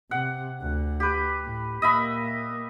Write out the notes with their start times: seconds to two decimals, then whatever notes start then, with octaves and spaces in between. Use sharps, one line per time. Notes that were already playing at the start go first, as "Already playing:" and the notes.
0.11 C3 F#5
0.61 D2
1.00 G4 B4
1.45 A2
1.82 A#2 A#3 D#5 E5 B5